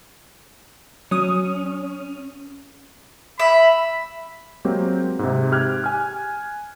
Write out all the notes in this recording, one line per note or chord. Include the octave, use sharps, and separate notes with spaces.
F#3 C#4 D#6
E5 B5
F#3 G#3 A#3 C4 G4
G#2 C3
G4 F6 F#6 G#6
G#5 F6